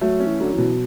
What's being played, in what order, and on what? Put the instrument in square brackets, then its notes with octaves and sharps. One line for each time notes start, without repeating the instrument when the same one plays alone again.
[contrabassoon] F#3 [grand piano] A3
[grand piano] C#4
[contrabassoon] E3
[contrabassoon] D3 [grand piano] F#3
[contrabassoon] E3
[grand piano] B2